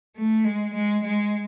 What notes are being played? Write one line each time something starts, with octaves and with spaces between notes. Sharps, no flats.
A3
G#3
G#3
G#3